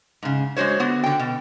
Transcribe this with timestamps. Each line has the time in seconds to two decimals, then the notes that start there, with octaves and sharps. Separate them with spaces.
0.23 G#2 C#3
0.57 G#3 D4 F#4 C5 C#5
0.80 D3 B3 F#4
1.03 D3 G5
1.19 B2